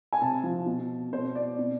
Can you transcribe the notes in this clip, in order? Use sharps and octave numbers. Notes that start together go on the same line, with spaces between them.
G#5
C3 A5
F3
B2
B2 C5
D5
B2